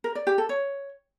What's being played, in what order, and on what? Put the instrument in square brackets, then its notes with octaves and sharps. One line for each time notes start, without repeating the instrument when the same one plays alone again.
[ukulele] A#4
D5
G4
A4
C#5